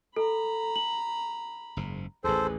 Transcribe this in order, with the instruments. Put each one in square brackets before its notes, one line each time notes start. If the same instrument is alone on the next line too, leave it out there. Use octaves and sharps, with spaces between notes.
[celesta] A4 [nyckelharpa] A#5 B5
[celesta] F#7
[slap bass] F#1 G#2
[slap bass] A1 D#2 [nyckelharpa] G#4 B4 [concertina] A4 C5